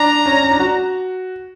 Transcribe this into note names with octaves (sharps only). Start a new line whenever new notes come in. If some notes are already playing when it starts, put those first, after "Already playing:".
Already playing: D4 A#5
C#4
C#4
D4
F#4